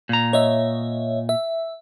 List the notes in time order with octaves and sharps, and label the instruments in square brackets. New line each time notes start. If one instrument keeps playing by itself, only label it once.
[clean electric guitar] A#2 A#5
[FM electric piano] C#5 D#5 E5
E5